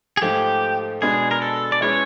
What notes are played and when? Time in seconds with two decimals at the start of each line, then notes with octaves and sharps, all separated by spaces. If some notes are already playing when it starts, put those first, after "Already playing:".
0.17 G#4
0.22 G#2 F3 A3 G4
1.02 B2 G#3 B3 D4 G#4
1.31 A#4
1.42 A4
1.72 D5
1.81 G#3 C#4 E4 G#4 B4 C#5